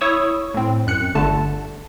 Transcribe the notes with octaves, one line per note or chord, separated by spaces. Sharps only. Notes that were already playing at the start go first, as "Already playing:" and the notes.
E4 C#5 C#6 D#6 E6
A2 C4
F#2 F#6 C#7
G1 D3 A3 A5